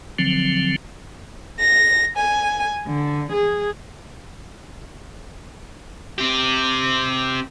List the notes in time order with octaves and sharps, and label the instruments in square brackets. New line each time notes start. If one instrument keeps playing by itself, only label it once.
[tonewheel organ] D3 F3 F#3 C4
[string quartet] A#6
G#5
D3
G#4
[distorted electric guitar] C4 G4